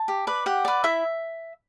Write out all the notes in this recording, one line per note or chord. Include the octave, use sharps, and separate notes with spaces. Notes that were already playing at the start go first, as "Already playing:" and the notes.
Already playing: A5
G4
B4 D5
G4 F#5
B4 D5
E4 E5